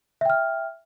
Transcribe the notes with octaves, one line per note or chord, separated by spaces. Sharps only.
E5 G5 F6